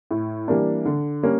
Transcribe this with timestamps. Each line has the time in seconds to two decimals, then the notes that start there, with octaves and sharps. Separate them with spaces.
0.11 A2
0.48 E3 G3 A#3 D4
0.85 D3
1.23 G3 A#3 C#4